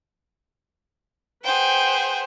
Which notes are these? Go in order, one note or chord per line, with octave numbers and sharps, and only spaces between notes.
G#4 B4 C5 F#5 G5